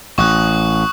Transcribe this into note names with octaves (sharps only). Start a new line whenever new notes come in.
A1 C#6 D#6 F#6